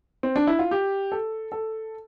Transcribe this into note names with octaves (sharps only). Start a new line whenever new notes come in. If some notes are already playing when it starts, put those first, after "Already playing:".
C4
D4
E4
F4
G4
A4
A4